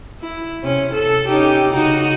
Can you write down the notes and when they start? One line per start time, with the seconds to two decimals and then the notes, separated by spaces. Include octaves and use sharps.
0.21 E4
0.63 C3 C#4
0.93 A4
1.27 C#4 D#4 G4
1.70 C#3 D#4 F#4